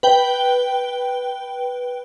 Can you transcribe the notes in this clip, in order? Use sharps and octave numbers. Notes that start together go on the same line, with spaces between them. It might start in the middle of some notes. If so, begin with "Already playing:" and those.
B4 G5 G7